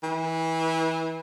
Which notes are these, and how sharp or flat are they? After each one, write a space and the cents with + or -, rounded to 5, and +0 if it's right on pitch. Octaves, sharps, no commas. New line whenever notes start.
E3 -25